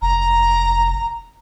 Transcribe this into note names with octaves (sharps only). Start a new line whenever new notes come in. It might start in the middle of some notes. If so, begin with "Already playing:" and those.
F1 A#5